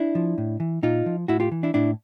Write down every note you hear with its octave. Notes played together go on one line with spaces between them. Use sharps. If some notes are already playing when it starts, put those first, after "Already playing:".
Already playing: D4 E4
F3
A2
E3
A#2 D#4 F4
F3
A2 E4 F#4
F4 G4
E3
D4 E4
A2 D4 E4